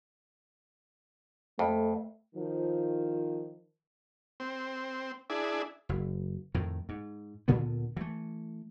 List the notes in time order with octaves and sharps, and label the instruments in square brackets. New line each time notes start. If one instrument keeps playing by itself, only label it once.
[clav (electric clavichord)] F2 [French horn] A3
[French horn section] D#3 F3
[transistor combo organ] C4
D4 E4 G#4
[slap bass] F#1
F2 A2 D#3
G#2
D2 A#2 D3 B3
E3 A3